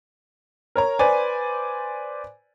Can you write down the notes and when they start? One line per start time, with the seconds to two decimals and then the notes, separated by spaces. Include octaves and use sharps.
0.76 A#4 C#5 A#5
0.99 B4 C5 D5 G#5